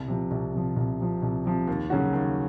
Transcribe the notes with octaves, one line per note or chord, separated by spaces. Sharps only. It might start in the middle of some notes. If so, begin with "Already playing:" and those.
Already playing: C2
C3 F3
C2
C3 F3
C2
C3 F3
C2
C3 F3
D#2
C#3 F#3 C#4 F#4
D#2